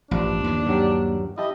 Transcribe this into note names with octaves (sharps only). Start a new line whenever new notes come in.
A1 G2 F3 D4 B4
D#2 D#3
G2 F#3 G4
E4 G4 D#5 A5